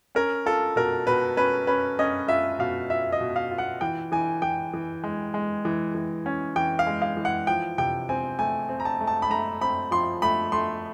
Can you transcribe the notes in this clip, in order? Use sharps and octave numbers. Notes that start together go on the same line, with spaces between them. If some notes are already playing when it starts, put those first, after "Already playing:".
C#4 A#4
F4 A4
B2 A#4
B2 B4
C#4 B4
C#4 B4
C#4 D#5
F4 E5
B2 F5
F4 E5
D#5
B2
F5
F4
F#5
E3 G5
E3 G#5
E3 G5
E3
G#3
G#3
E3
E3
C#4
E3 G5
F5
G#3
F5
E3
F#5
F3 G5
C3 G5
C4 G#5
A3 G#5
C4
A#5
A5
A3
A5
B5
A3 A#5
C4 B5
F3 C6
A3 B5
A3 C6